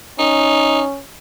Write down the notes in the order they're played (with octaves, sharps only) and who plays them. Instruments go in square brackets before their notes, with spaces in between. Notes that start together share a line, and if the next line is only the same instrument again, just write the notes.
[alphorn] C#4 [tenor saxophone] D#4